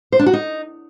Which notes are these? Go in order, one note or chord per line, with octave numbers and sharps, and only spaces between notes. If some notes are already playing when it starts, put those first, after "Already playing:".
C5
D4
F#4
D#4